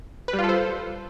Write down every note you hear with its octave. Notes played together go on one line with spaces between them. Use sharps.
B4
G3
F4
A4
C5